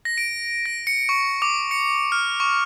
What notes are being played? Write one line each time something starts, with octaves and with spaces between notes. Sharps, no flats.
A#6
D7
A#6
C#7
C#6
D6
C#7
F6
C#6